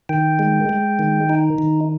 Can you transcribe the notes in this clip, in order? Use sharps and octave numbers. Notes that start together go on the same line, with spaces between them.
D#3 G5
G#3
G#3
D#3
D#4
D#3